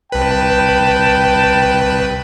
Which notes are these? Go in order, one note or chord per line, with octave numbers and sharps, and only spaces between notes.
C2 B4 G5 A5